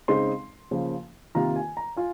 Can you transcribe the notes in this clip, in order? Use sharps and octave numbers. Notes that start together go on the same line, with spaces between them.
C#3 G#3 C4 D#4 C6
C#3 F3 A#3
C3 D#3 A#3 F4 A#5
G#5
A#5
F4 G#5